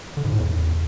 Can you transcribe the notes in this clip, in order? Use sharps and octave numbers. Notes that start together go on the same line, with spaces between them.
D3
G#2
A2
E2